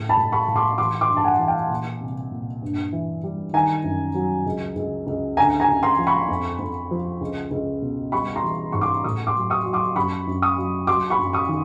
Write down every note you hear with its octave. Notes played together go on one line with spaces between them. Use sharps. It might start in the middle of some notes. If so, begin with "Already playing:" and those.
Already playing: A2 C#3
A5 B5
A2
B5 C#6
A2
C6 D6
E3 C6 D6
C6 D6
G2
A5
F#5 G#5
E3
F5 G5
A#2
C2
A#2
G2
E3
G3
D#3 G#5 A#5
F#2
F#3
C#2
C#2
C#2
D2 G#5 A#5
G#5 A#5
C#3
A#5 C6
F3
B5 C#6
F2
F2
F3
C#2
C#2
B2
G3 B5 C#6
A#5 C6
E3
G#2 C#6
C6 D6
A2 C#6 D#6
C6 D6
F#3
C#6 D#6
F#3
C6 D6
F#2 B5 C#6
F#2
C#6 D#6
F#3
F#3 C6 D6
B5 C#6
F#2
C#6 D#6
D#3